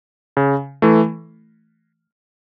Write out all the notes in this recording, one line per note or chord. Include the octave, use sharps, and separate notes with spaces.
C#3
E3 A3